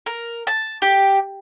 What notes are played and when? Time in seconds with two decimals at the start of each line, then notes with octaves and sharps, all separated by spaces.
0.06 A#4
0.47 A5
0.82 G4